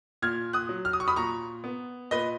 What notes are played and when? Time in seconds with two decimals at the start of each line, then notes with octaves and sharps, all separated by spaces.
0.22 A#2 F6 G#6
0.53 D#6 F#6
0.69 F#3
0.85 F6
0.93 D#6
1.00 C#6
1.08 B5 D#6
1.16 A#2 A#5 C#6
1.64 B3
2.11 A#2 B4 D#5